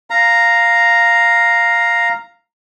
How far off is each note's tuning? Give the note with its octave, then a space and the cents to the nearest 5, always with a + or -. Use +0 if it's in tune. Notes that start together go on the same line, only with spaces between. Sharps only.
F5 +0 A#5 +0